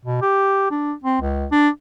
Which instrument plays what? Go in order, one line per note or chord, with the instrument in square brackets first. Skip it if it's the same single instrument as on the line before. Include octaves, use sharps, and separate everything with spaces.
[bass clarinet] B2
G4
D4
C4
C#2
D4